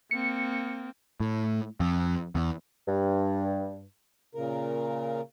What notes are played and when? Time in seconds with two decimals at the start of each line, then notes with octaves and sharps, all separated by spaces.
0.11 A#3 C4 C#7
1.20 A2
1.80 F2
2.35 E2
2.88 G2
4.35 A#2 C#3 A#4